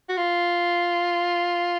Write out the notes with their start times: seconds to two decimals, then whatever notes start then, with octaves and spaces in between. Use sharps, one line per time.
0.09 F#4
0.17 F4